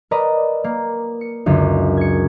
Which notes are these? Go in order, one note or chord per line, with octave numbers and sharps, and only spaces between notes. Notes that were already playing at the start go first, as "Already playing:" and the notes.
A#4 B4 D5 D#5 A#5
A#3
C#7
F#1 C#2 F#2 D3
G#6 C#7